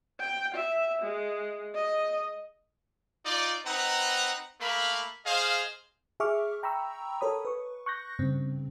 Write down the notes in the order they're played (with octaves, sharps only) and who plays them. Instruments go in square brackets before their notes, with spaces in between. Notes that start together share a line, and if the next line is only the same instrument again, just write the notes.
[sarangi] G5
E5
G#3
D#5
[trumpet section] D#4 F4 D5
C4 D#4 B4 F#5 A#5
A3 A#3 A#4 F5 B5
G#4 C5 D#5 F5
[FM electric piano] G#4 E5 C#6 D6 F6
G5 A#5 B5 C#6 E6
A4 A#4 C#5 B5 D#6
B4 C#6
C#6 F#6 G6 A#6
G2 C#3 C4